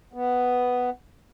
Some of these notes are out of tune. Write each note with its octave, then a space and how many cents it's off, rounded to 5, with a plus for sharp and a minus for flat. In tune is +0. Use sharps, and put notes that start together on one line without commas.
B3 +5